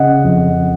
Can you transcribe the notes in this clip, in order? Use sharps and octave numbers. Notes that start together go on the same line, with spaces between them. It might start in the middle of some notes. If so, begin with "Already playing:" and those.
Already playing: C#3 D#5 F#5
F2